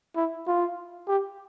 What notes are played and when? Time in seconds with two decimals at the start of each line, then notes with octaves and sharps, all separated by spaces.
0.16 E4
0.47 F4
1.08 G4